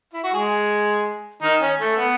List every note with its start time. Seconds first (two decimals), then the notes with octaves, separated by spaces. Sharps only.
0.14 E4
0.24 F#4
0.34 G#3 G#4
1.42 D#3 D#4
1.61 C#4
1.80 A3
1.97 B3